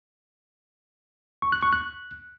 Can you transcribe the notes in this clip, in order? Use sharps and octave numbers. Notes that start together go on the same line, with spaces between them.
C#6
F#6
C#6
F#6